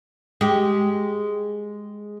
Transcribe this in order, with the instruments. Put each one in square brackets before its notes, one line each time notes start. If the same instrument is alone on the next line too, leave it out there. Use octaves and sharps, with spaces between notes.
[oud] G#3 G4